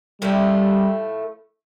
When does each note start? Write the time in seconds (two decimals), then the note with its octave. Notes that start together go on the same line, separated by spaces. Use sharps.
0.22 A2 F3 G3 A3